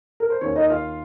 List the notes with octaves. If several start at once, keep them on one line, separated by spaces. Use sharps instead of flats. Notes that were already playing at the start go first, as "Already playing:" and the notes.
A#4
C5
D#2 D#3 C#4 C#5
D#4 D#5
F4 F5